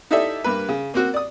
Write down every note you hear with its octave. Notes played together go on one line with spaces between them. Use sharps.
D#4 E4 G4 A4 D5 E5
G2 A#3 B4
C#3
A#3 C4 F#4
D5 D#6